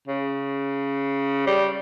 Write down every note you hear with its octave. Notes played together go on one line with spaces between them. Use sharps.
C#3
G3